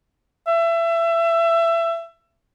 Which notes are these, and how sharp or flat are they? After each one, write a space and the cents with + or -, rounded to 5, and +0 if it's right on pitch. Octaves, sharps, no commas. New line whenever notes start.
E5 +25